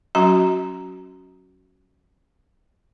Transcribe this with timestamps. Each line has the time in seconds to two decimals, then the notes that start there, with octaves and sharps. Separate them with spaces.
0.15 F#3 C#4 F#4 A#5